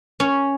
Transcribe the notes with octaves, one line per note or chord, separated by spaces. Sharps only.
C#4